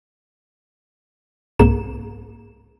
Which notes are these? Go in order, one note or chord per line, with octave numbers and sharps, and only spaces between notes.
C2 G#2 A#3 E7